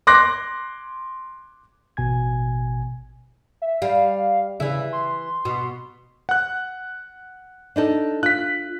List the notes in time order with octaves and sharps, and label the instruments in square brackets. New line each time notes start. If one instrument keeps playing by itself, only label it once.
[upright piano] C6 D6 F#6 A#6
[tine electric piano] A1 B2 G#5 G#6
[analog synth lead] E5
[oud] G3 [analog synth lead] F5
[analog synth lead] C#3 [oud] E3 E4
[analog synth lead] C6
[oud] B2
[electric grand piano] F#5 F#6
[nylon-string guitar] D4 D#4 A4
[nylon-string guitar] F4 [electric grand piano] F#6 B6